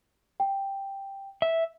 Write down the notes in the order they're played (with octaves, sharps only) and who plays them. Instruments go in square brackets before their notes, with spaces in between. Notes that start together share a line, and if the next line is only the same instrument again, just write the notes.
[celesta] G5
[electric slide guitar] E5